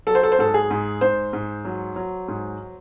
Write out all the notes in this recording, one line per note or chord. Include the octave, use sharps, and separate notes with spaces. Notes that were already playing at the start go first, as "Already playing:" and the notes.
F#3 A4
C5
A4
C5
G#2 A4
G#4
G#2
G#2 C5
G#2
F#3
F#3
G#2